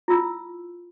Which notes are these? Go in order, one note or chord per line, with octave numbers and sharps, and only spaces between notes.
E4 F4 E6